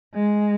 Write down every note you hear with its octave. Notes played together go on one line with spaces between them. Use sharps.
G#3